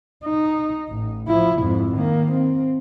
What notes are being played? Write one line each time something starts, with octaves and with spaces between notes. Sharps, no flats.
D#4
A1
F3 E4
F2 G#2
D#3 A#3
C4